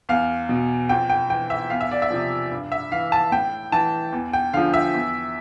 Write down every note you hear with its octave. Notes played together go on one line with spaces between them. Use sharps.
E2 F5
B2
F2 G5
G5
E3 G5
E5
E2 F5
E5
D5
E5
C3 F3
G2
E5
E3 F5
A5
A2 G5
E3 A5
E2
G5
D3 F3 F5
E5
E2